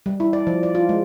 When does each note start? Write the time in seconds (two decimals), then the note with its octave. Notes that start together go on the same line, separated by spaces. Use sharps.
0.06 G3
0.20 E4
0.33 D5
0.47 F3
0.63 D5
0.75 F4
0.89 G#3